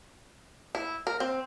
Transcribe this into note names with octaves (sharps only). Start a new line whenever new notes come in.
E4
A#4
C4